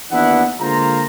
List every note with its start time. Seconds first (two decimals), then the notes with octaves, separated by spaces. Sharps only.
0.11 D#2 E3 B3 D4 E4 F#5
0.60 D3 G#3 A#3 F4 C5 A#5